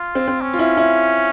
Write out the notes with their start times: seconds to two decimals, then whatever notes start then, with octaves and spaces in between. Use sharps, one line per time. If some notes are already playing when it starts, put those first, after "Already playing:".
Already playing: F4
0.15 C4
0.28 C4
0.41 C#4
0.54 F4
0.59 E4
0.77 E4